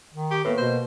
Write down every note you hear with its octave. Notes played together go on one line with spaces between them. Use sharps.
D#3
G4 C#6
A2 A#3 B3 B4
B2 C5